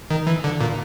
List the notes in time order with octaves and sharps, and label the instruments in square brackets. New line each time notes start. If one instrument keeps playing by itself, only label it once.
[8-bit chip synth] D#3
E3
D3
A#2